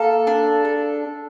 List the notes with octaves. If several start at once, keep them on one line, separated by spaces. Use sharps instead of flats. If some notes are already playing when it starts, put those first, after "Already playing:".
Already playing: A#3 A4 F5
D4
A4